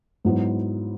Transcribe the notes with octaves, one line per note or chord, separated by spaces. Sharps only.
G#2 F#3 B3 E4